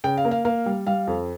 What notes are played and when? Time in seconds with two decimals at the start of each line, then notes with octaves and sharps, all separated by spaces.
0.04 C#3 G5
0.17 F5
0.25 A#3
0.31 F5
0.45 A#3 F5
0.66 G3
0.87 G3 F5
1.07 F2